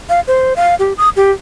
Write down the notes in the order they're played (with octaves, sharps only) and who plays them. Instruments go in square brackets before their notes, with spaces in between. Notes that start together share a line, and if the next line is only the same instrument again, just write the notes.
[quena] F5
C5
F5
G4
D#6
G4